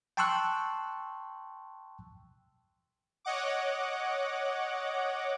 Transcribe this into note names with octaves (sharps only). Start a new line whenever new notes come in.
G5 A5 C6 C#6 E6 F#6
C#5 D#5 F#5 D6